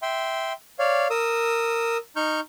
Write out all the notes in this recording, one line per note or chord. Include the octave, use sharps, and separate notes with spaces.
E5 G5 C6
C#5 D5 F5
A#4 D#6 E6
D#4 C#6 F6 G6